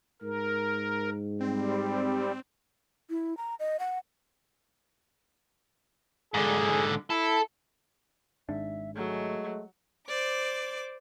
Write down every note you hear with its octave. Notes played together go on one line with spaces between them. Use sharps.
G#2 A#4
G3 C4
E4
A#5
D#5
F#5
G#2 D3 G#4
E4 A4
G#1 G#2 D4 E5
F#3 G#3 A3
C5 D5 D6